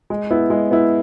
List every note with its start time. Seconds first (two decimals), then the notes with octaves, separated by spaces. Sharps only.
0.10 G#3
0.30 B3 E4
0.50 G#3
0.71 B3 E4